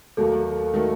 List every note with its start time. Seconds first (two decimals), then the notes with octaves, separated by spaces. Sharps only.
0.17 D#2 D#3 F#3 A3 A4
0.73 D#3 F#3 A3